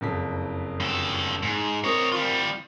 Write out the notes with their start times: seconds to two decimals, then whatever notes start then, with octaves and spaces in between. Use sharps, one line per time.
0.01 F#1 F2 B6
0.80 G2 A4
1.43 G#2
1.84 C4 A#4 C#5 D#5
2.12 G3 F4